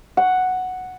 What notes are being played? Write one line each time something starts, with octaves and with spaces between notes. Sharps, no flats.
F#5